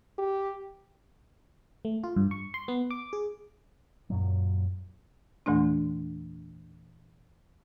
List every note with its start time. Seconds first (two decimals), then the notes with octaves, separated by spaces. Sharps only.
0.18 G4
1.85 A3
2.04 F4
2.16 G2
2.31 C#6
2.54 C6
2.68 B3
2.91 D6
3.13 G#4
4.10 F#2 A#2 F#3
5.46 E2 A#2 E3 A3 D4